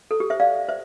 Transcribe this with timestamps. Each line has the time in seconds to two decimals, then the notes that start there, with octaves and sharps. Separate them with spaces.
0.11 A4
0.20 G4
0.30 C5 E5
0.40 D5 F5
0.69 C5 E5